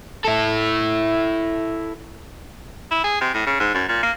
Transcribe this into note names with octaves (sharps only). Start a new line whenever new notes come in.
E4 A4
E4
G#4
C3
A2
C#3
G#2
F#2
A#2
A#3